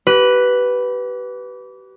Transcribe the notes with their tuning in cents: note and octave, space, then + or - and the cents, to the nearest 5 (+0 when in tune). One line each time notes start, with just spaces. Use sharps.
G4 -35 B4 +0